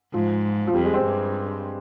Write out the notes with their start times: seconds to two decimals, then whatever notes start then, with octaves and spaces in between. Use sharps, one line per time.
0.14 G#2 F3
0.67 F3
0.74 F2 G3
0.84 G#3
0.94 C4
1.05 G2